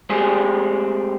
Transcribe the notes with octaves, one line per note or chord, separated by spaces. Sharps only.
G#3 A3 C4 G4 G#4